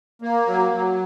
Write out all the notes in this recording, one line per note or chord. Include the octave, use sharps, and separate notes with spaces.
A#3
F#3
F#3